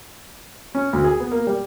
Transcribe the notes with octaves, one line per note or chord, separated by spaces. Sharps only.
C#4
D2
G#4
B3
A#3
G3